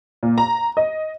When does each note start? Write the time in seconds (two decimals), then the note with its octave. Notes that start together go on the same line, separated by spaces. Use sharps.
0.23 A#2
0.38 A#5
0.77 D#5